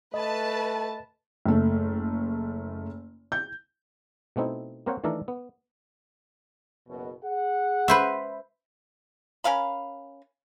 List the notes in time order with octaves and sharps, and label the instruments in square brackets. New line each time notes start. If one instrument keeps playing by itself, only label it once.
[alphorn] A3 [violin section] B4 A5 [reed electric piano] D#5 B5
[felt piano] F#1 A3
G6
[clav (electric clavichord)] B2 A3 C4 D#4 E4
A#3 C4 A#4 C5 C#5 F#5
D#3 E3 A3 D4 A4 A#4
B3
[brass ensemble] F#1 B2
G#4 F#5
[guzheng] B4 C5 E5
[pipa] C#4 A#4 F5 B5